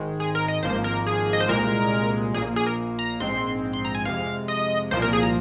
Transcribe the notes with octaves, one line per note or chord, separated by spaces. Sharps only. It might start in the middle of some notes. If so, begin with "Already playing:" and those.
Already playing: G#1 G#2 D#3 G#3
G#4
A#4
D#5
G#1 G#2 F3 A#3 C5
A#4
G#4
D#5
C5
C2 A#2 G#3 A#4
A#1 A#2 A#3 G#4
G#4
A#4
A#5
A#1 G#2 G#3 C4 C6
C6
A#5
G#5
F2 C3 G#3 F5
D#5
C2 A#2 F3 A#3 C5
A#4
G#4
A#5